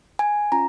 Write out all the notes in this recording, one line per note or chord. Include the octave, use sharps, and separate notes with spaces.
G#5
C#4 F4 A#5